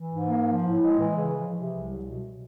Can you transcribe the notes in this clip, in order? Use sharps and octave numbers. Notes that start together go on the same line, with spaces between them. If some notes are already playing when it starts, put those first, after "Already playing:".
Already playing: E3
G#2
A#3
F3
A2
G#3
E3
C#3
F3
C3
C2
F#3
B2